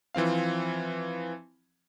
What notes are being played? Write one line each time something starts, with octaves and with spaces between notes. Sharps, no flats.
E3 F3 C4 F5